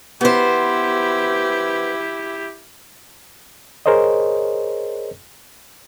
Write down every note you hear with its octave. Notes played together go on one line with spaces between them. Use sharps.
B3 E4 G4 C5
G#4 A#4 C5 C#5 D#5